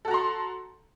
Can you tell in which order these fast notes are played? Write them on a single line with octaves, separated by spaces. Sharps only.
A4 F#4 A#5 C6